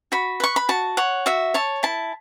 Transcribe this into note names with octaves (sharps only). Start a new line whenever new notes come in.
F#4 B5
B4 C#6
B5
F#4 A5
C#5 F#5
F#4 E5
C#5 A5
E4 A5